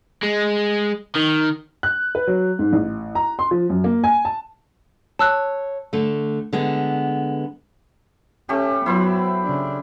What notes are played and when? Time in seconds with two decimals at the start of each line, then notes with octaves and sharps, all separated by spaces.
0.23 G#3
1.16 D#3
1.83 F#6
2.15 B4
2.27 F#3
2.59 G#2
2.73 A1
3.15 A#5
3.39 C6
3.51 F3
3.70 F#2
3.84 A#3
4.04 G#5
4.25 A5
5.19 C#5 A5 E6 F#6
5.93 D3 A3
6.53 D3 G#3 B3
8.49 A3 C#4 G4
8.86 F#3 B3 E4 C5 E5
9.43 C#3 D4